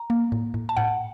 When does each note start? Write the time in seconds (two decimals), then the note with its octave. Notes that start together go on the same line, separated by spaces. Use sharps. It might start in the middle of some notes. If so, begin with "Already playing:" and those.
Already playing: A#5
0.10 A#3
0.32 A2
0.54 A2
0.69 A5
0.77 A2 F#5